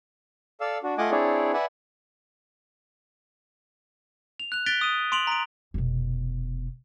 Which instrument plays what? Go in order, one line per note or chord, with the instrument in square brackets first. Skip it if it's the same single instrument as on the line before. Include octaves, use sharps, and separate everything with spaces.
[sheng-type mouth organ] A4 D5 F5 E6
D4 F#4
A3 F4 D#5 F#5 G#5 D6
C4 D4 E4 G#4 C#5 D5
B4 D5 E5 F#5 G#5
[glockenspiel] F7
F#6 F7
F#6 A6 B6 D7 G7
D#6 D#7
C6 D7 F7 F#7
A#5 D7
[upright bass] F1 B2